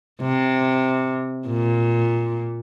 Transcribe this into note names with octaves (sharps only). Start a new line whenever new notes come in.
C3
A#2